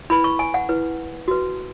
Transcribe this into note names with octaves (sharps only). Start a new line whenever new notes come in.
E4 B4 B5
C#6
G#5
F#5
E4 B4
F#4 B4